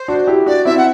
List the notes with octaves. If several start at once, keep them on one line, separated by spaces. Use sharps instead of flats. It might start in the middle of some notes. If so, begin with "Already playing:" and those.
Already playing: C5
D4 F#4
E4 G4
D4 F#4 D5
C4 E4 E5
F#5